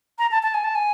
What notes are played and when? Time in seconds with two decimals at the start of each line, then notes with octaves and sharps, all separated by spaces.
0.19 A#5
0.31 A5
0.43 A5
0.54 G#5
0.64 A5
0.75 G#5